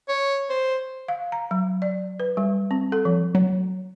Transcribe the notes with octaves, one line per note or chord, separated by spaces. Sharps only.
C#5
C5
F5
A#5
F#3
D5
B4
G3
C4
A4
F3
F#3